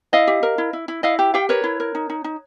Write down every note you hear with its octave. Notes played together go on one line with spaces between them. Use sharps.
E4 D#5 F5
G4
A#4
E4
E4
E4
E4 D#5 F5
G4
G4 F5 G5
A#4 B4 C#5
E4
A#4
D#4
D#4
D#4